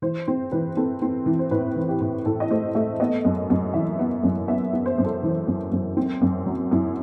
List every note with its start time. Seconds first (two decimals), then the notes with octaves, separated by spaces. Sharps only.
0.02 E3 C5
0.28 C4 C5
0.52 E3 B4
0.77 C4 A4
1.02 C4
1.26 E3
1.39 C5
1.51 A2 B4
1.76 E3
1.89 G4
2.01 A2
2.25 A2 A4
2.40 D#5
2.50 A3 C5
2.75 A3 E5
3.00 B3 D#5
3.25 F#2
3.50 F#2
3.74 E3 E5
3.99 B3
4.23 F#2
4.48 B3 E5
4.73 B3
4.86 C5
4.98 F#2
5.04 A4
5.23 E3
5.47 F#2
5.72 F#2
5.97 C4
6.21 F#2
6.46 F#3
6.71 F#2 E4